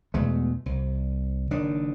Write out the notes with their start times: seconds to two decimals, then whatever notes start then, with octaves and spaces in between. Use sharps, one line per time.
0.14 E2 B2 G#3 A3
0.66 C2
1.51 F#1 D#3 D4